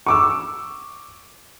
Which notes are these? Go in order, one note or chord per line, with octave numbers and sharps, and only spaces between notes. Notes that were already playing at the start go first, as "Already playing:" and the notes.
C#6 D6 E6